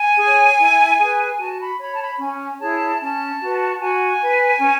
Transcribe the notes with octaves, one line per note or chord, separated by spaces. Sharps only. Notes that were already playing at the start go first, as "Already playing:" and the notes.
Already playing: G#5
G#4
C#5
E4
G#4 B4
F#4 A5
B5
C#5 B5
A5
B5
C#4 G#5
E4 G#4 C#5 A5
C#4 A5
F#4 B4
F#4 G#5
B4
C#4